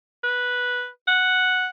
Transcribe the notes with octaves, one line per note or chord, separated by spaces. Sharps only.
B4
F#5